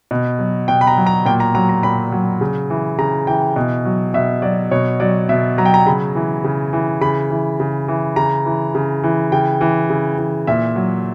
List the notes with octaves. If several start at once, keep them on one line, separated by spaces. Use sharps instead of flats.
B2
F#3
B2 G5
B5
A#5
F#3
A#5
A#2 G5
A#5
F#3 A#5
A#5
A#2 B5
F#3
C#3
E3
C#3 A#5
E3 G5
B2
F#3
B2 E5
F#3 D5
B2 C#5
F#3 D5
B2 E5
F#3 A#5
G5
A#5
C#3 B5
E3
C#3
E3
C#3 B5
E3
C#3
E3
C#3 A#5
E3
C#3
E3
C#3 G5
E3
C#3
E3
A#2 E5
F#3